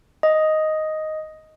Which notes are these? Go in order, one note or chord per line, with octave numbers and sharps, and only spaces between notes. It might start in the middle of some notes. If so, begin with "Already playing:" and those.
D#5